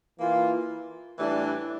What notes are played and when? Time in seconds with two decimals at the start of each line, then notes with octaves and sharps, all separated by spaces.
0.18 E3 A#3 F4
1.19 A2 E3 G3 D4